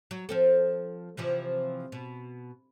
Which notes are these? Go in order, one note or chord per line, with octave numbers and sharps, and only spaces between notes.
F#3
F3 C4 A4
C3 E3 F3
B2